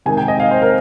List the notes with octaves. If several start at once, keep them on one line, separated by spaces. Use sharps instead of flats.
C3 D#3 G#3 G#5
G5
D#5
F5
C5
A#4